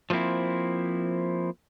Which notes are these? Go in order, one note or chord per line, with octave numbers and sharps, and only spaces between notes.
F3 A3 A#3 C4 E4